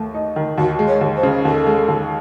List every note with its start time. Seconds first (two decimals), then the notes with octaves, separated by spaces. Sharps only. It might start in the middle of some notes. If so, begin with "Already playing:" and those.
Already playing: D#2 A3
0.14 D#4
0.36 D#3
0.57 D#2 F#4
0.79 G#3
0.87 C#5
1.01 D#2
1.16 C5
1.23 C#3
1.45 D#2 A4
1.67 G#3
1.88 D#2